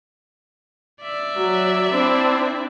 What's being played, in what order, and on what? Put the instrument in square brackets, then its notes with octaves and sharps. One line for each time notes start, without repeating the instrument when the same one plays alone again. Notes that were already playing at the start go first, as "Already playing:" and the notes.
[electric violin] D5 E5
[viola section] F#3
C4 D4 E4